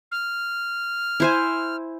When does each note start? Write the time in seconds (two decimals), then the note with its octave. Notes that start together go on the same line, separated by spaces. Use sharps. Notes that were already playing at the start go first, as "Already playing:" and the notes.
0.12 F6
1.20 E4 C5 G#5